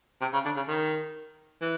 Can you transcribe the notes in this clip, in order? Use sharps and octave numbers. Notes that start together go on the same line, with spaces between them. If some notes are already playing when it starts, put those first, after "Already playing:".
C3
C#3
D3
C#3
D#3
E3